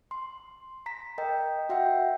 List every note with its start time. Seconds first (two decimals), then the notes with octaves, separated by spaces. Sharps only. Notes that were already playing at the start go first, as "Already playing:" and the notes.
0.11 C6
0.86 A#5 B6
1.18 A#4 D#5 G5
1.69 F#4 E5 F#5 G5